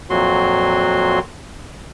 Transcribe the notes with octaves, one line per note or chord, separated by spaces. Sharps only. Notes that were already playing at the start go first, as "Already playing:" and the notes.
F2 A#2 F#3 F#4 C6